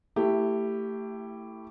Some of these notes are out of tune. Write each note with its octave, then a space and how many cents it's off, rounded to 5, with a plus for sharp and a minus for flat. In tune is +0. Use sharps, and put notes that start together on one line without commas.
A3 +25 E4 +0 G4 +0